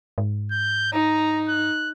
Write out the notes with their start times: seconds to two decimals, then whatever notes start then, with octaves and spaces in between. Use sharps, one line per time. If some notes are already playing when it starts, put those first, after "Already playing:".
0.18 G#2
0.51 G6
0.93 D#4 A#5
1.48 F#6